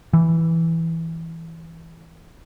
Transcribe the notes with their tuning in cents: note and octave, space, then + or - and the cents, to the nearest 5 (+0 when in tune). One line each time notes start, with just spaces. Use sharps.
E3 -5